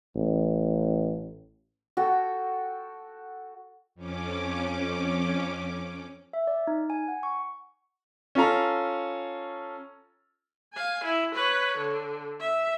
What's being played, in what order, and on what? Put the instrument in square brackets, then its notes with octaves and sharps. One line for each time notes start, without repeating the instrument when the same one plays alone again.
[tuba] A1
[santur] F#4 A4 G5
[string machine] F2 C#4 D6
[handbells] E5
D5
D#4
G#5
F#5
C#6
[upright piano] C#4 F4 A4 A#5
[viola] F5 G#5
E4
B4 C#5
D3
E5